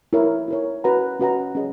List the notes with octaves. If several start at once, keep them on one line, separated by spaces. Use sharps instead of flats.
E4 A#4 C#5
E4 A#4 C#5
C#4 F#4 B4 F#5 A#5
C#4 F#4 B4 F#5 A#5
C#4 G#4 D#5